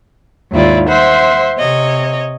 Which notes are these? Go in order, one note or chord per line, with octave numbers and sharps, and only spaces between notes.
D#2 G#2 E4 F4 D5
C5 E5 F#5 C6
C3 C#5 D#5